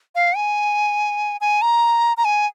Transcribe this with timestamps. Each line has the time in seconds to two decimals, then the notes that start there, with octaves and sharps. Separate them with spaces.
0.15 F5
0.36 G#5
1.41 G#5
1.62 A#5
2.17 A#5
2.25 G#5